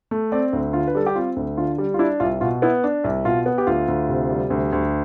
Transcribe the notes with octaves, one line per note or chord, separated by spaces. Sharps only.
A3
C4 D5
D2
D3 F4
B4
G3 A4
G4
C4 F4
D2
D3 F4
G3
F4
D4 E4
C2 F4
B2 F4
B3 E4
D4
C2
B2 F4
B3
G4
D2 F4
D2
C3
G3
D2
D2